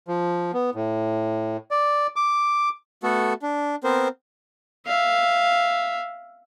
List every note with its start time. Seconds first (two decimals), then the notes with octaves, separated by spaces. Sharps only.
0.08 F3
0.53 B3
0.75 A2
1.71 D5
2.16 D6
3.03 A3 B3 F#4 A4
3.42 D4
3.84 B3 C4 A#4 C5
4.86 E5 F5